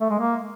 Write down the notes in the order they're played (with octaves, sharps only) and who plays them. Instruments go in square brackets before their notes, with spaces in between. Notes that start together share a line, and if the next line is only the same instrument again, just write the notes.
[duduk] A3
G#3
A#3